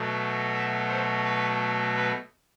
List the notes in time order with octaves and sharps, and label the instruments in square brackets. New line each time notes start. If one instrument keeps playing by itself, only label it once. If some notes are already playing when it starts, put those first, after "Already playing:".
Already playing: [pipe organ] B2 F#3 A3
E5
C5
B4
B4